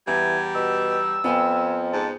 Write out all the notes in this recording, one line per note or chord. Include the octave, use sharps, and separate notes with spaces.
E2 E3 G3 G#5
B2 E6
F2 B3 G5 G#5
G#2 A5